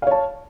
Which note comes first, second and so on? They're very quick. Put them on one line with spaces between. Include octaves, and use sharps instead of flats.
F5 C#5 A5